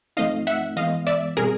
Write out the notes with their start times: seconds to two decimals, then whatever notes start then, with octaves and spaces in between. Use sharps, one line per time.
0.17 F3 A3 C4 D#4 D#5 F5
0.47 E5 F#5
0.76 E3 G#3 B3 D#5 F5
1.07 D5 E5
1.37 B2 G3 C4 G#4 A#4